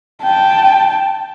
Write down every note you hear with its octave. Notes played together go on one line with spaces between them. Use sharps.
G5 A5